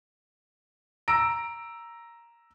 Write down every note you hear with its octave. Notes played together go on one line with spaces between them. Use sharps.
A#5 E6 A#6 D7